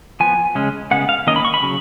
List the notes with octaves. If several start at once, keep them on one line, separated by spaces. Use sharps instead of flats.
F3 B3 G#5
C#3 G#3 C#4
C#3 G#3 B3 F#5
F5
D#3 A#3 C#4 D#5
B5
C#6
B5
C#3 F#3